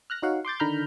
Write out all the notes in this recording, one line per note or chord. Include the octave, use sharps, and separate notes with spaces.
F6 F#6 A#6
D#4 F#4 C#5 F5 F#5
C6 D6 G6 A6
D3 D#3 A#5 B5 F6 G6